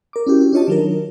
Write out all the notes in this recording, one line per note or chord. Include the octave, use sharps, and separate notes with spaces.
A#4 D6
C#4 E4 F#4 G4
D4 F4 C#5 D#5 A5
D#3 F#3 A#4